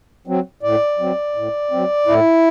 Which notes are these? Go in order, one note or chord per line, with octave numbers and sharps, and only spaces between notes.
F#3 C4
A2 D5
F#3 C4
A2
F#3 C4
A2 E4